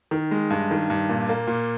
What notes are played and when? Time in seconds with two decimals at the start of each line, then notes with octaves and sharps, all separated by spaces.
0.11 D#3
0.31 G#3
0.50 G2
0.71 D#3
0.90 G2
1.09 A#2
1.29 A#3
1.47 A#2